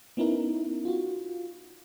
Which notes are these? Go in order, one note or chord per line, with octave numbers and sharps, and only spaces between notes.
B3 C#4 D#4 E4 A#4
F4 F#4